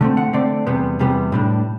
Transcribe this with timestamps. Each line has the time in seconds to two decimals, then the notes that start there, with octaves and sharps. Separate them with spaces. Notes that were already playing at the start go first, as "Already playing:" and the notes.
0.01 D3 A3 C4
0.17 F#5
0.33 D3 A3 C4 D5
0.67 E2 C3 G3 B3
0.99 E2 C3 G3 B3
1.32 A2 G3 D4